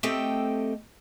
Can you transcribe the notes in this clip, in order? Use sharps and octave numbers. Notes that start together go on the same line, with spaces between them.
A3 C4 G4 A4 D#5 G5